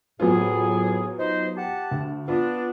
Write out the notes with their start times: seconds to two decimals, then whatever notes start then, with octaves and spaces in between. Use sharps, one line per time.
0.20 F2 A2 F#3 B3 F4 G#4
1.19 D#4 C5
1.56 G4 F#5 A5
1.91 D2
2.28 B3 D4 F4